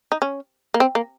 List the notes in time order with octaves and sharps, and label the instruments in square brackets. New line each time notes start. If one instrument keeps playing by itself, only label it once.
[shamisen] D#4
C#4
A#3
C4
A#3